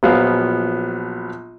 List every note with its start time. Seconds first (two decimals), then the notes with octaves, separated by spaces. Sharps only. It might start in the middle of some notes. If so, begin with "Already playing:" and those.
0.03 A#1 F3 F#3 B3 F5